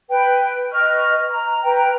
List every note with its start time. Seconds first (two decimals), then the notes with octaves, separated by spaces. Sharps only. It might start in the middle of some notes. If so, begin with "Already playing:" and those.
0.10 B4 G5
0.72 B4 D#5 C#6 F6
1.30 A#5
1.63 B4 G5 A#5